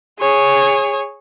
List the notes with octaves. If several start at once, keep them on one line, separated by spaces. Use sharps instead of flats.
G#4 C#5